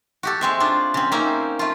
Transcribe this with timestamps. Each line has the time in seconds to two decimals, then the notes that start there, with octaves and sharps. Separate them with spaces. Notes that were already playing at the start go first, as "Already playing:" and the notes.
0.23 F#4 G4 A4
0.41 G#3 C4 E5
0.60 D4 F4
0.94 C#3 C4
1.12 A#3 C4 C#4 D#4 E5
1.59 A3 F4